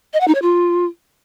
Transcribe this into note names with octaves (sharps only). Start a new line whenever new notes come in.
D#5
F#5
D#4
C#5
F4